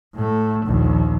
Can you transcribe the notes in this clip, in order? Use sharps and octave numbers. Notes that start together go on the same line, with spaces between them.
A2 A3
A#1 D#2